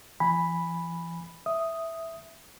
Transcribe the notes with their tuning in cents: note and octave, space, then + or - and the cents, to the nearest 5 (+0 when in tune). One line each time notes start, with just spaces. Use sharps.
E3 +45 G#5 -10 B5 +0
E5 +0 D#6 +0